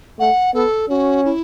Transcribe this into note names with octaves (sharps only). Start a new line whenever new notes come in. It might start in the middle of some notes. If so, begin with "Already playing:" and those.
A3 F#5
B3 A4
C#4 F#4
E4